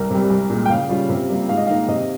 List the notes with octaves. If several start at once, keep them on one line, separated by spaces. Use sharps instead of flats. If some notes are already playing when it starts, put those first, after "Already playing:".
Already playing: C2 A#4
C3 G3
C2
A#2 G#3
G5
C#3 F5
G3 C#4 F4
C3
G3 A#3 F4
G#2 F5
D#5
D#3 A#3 D#4 F5
C3 D#5